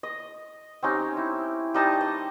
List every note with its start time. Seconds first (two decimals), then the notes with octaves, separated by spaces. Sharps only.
0.03 D#5
0.83 C4 C#4 D#4 G4
1.17 E4
1.74 G3 D#4 A5 D#6
2.01 D#5